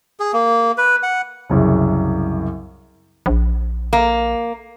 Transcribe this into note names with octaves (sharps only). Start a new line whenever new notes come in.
G#4
A#3
B4
F#5
C2 F#2 C#3
A#1
A#3